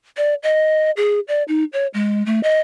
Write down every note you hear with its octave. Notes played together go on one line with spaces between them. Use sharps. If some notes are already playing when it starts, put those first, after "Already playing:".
D5
D#5
G#4
D5
D#4
C#5
G#3
A3
D#5